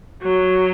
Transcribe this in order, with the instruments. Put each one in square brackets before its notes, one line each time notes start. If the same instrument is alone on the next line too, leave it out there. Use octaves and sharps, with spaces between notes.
[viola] F#3